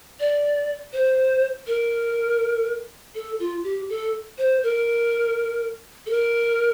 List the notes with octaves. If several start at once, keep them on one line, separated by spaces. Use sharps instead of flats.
D5
C5
A#4
A4
F4
G4
A4
C5
A#4
A4
A#4